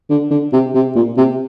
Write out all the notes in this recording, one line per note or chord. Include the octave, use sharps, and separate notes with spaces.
D3
D3
C3
C3
A#2
C3